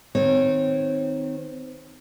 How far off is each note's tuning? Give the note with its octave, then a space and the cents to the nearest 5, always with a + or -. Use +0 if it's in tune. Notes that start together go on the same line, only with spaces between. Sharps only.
D#3 +0 C4 -25 C#5 -30